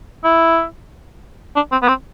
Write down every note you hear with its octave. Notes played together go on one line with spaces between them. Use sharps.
E4
D4
C4
B3
C4